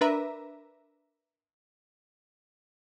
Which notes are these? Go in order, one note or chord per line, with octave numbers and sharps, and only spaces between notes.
D4 A#4 B4 E5 A#5